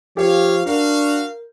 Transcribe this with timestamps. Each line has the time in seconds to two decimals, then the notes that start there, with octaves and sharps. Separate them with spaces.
0.17 F3 G4 C#5 F5
0.66 D4 F#4 A#4 F5